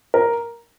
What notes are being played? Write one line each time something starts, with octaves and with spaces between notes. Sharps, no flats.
A#4